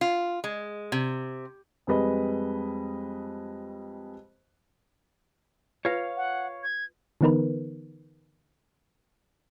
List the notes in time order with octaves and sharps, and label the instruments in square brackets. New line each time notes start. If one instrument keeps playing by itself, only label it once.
[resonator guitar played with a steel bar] F4
G#3
C3
[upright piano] F2 G3 G#3 B4 D#5
[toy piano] F4 B4 [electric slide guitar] C#5 F5
[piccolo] F#5
G#6
[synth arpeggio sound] D3 E3 B3 D#4 A#4 B4